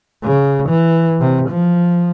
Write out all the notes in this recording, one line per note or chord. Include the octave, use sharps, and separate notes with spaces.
C#3
E3
C3
F3